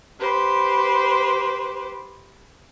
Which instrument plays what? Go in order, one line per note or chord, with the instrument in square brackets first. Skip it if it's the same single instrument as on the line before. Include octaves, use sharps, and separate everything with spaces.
[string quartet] G4 B4 C5